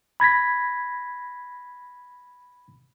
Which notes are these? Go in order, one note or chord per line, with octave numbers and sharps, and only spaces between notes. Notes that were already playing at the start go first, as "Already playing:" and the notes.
B5 G#6 A#6 B6